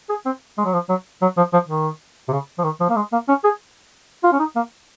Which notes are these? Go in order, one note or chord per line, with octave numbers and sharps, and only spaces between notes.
G#4
C4
G#3
F#3
F3
F#3
F#3
F3
F3
D#3
C3
C#3
F3
D#3
F3
A#3
G#3
A#3
C#4
G#4
F4
C#4
D#4
A#3